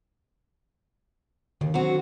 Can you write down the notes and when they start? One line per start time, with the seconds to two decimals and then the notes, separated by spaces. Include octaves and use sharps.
1.61 D#2 D3 D#3
1.74 F#3 C4 F#4